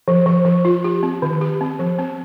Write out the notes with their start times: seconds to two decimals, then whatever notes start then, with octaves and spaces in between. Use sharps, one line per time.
0.08 F3
0.26 F3
0.45 F3
0.65 F4
0.84 G4
1.03 C4
1.22 D#3
1.41 G4
1.61 C4
1.79 F3
1.99 C4